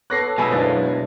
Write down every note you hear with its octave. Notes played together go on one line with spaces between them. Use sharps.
B3 A4 C#5 D6 F#6 A#6 C7
B2 G#3 A3 B3 D#4 G#5 B5 E6
F#1 B3 D4 E4 C5 F5 A6